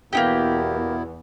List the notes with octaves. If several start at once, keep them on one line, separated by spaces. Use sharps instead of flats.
E2 B2 A#3 B3 D#4 E4 G4